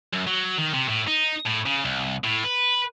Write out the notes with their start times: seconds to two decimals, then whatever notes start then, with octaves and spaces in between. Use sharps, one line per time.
0.13 F#2
0.27 F#3
0.58 D#3
0.74 C3
0.88 A2
1.07 D#4
1.46 A2
1.66 C#3
1.85 C2
2.24 A2
2.44 B4